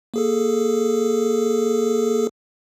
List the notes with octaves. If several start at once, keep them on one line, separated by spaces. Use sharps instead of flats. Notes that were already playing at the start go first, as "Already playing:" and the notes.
A#3 G#4 A4